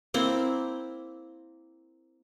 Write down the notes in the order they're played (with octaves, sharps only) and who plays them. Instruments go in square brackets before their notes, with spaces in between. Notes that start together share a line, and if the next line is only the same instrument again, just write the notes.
[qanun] A#3 C4 E4